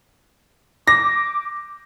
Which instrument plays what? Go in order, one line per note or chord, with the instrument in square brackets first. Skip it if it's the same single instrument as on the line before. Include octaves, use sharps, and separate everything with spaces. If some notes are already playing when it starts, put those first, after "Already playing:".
[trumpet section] D6 [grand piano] A#6